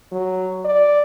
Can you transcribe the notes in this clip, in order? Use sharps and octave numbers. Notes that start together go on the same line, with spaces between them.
F#3
D5